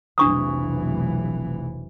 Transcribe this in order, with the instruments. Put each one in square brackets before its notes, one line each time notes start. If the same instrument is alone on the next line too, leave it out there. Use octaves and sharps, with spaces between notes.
[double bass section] F1 B1 E3 [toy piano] D4 C#6 D#6